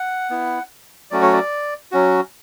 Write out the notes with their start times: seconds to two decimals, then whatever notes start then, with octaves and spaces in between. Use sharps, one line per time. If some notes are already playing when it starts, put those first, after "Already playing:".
Already playing: F#5
0.30 B3 E4
1.11 F#3 A3 C#4 F#4 D5
1.22 C#5
1.33 D5
1.92 F#3 C#4 F#4